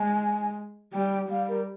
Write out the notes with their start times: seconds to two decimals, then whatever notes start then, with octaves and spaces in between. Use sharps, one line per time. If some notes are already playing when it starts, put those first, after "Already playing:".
Already playing: G#3 G#5
0.93 G3 G5
1.29 G3 F5
1.48 A#4